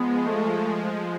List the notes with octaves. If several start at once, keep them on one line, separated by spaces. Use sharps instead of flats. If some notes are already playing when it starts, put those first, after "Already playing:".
Already playing: F3 G#3 B3
A3